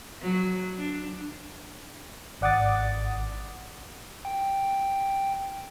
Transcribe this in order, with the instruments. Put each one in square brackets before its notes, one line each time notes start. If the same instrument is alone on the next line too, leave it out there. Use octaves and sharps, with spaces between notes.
[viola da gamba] F#3
D4
[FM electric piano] G#1 D5 F#5 D6 D#6 A6
[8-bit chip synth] G5